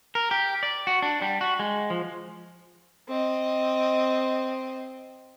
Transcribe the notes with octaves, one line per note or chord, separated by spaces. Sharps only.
A#4
G4
D5
F#4
D4
G3
F#4
G#3
F3
C4 D#5